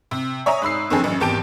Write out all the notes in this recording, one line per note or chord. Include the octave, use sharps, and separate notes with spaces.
C3
C#5 E5 G#5 A#5 D#6
G#2 B5 E6 C7
F#1 F2 D3 C4 G#4 A4
A1 F#2
G#1 E2 G4 A5 D7